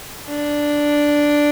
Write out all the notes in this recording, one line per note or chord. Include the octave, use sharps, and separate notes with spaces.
D4